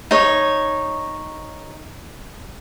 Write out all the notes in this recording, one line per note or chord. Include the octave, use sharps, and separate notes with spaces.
D#4 C#5